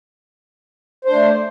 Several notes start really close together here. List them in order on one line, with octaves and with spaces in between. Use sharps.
C5 D4 A3